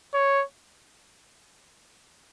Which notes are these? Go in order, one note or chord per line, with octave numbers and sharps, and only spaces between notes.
C#5